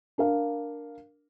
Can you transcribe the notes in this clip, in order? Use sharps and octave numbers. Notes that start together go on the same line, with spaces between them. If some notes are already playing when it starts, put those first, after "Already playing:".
D4 A#4 F5